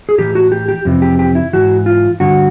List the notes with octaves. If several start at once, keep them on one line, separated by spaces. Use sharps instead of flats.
G#4
A2 E3 G4
F#4
G4
G4
F2 C3 E3
G4
G4
E4
G#2 E3 F#4
F4
G2 D3 F#4